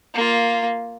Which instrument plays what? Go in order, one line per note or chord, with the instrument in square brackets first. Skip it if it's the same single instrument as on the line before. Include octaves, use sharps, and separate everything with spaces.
[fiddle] A#3 F4